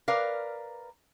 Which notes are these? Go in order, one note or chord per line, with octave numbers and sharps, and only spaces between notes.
A#4 B4 D5 F5